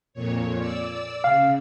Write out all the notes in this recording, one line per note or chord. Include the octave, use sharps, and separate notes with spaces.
F2 A#2 C#5
D5 E6
C#3 F5